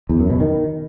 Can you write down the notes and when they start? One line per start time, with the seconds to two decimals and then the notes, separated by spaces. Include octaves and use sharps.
0.09 E2
0.20 F#2
0.30 B2
0.40 D#3